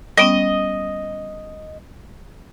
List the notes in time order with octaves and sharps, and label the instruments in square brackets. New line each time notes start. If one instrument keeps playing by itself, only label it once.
[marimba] G3 B3 C#4 [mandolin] D#5